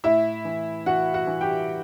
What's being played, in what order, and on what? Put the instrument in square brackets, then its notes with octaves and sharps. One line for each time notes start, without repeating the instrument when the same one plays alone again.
[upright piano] A2 E4 E5
E3
E3 F#4 F#5
F#4 F#5
E3
G4 G5